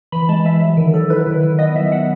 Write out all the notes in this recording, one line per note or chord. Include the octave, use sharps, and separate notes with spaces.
E3 B5
G#3 A5
E3 E5
F#3
D#3
F#3 A4
E4 B4
D#3
B4
D#3
B3 D#5
F#3 E5
B3 F#5